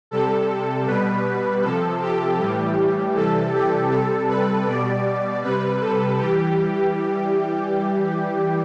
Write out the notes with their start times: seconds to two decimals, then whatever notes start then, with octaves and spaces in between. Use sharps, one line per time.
0.11 C3 G3 A4
0.87 B2 G3 B4
1.63 C3 F3 A4
2.02 G4
2.39 A2 E3 G3 G4
3.15 C3 E3 G3 A4
3.53 G4
3.91 C3 G3 A4
4.29 B4
4.67 B2 G3 D5
5.43 C3 G3 B4
5.81 A4
6.19 E3 G3 G4